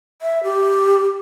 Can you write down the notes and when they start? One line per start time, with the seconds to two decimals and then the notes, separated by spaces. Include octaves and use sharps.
0.22 E5
0.44 G4